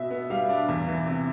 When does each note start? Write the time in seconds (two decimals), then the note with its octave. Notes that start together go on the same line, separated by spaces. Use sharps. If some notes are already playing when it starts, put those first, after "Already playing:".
Already playing: B2 E5
0.10 B3
0.30 G3 F5
0.49 D4
0.69 E2
0.88 E3
1.07 C3